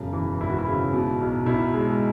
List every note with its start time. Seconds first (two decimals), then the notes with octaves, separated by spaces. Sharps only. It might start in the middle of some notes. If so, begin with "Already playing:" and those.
Already playing: E1 F#2 C#3
0.13 E3
0.40 G#1 E4
0.50 F#4
0.58 E4
0.67 C#3
0.93 B2
1.21 B1
1.46 B1 E4
1.73 G#3